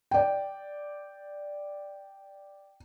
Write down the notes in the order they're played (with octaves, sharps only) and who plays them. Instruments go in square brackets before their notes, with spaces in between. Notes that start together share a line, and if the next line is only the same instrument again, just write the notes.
[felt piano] D5 G5